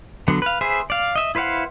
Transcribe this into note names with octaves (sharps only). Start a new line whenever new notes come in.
D3 F#3 B3
B4 F5
G#4 B4 C5 E5
D5 F5
D#5 E5
E4 B4 C5 F5 F#5